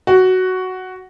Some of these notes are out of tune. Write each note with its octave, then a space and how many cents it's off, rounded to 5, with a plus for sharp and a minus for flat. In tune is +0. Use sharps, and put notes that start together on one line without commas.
F#4 +5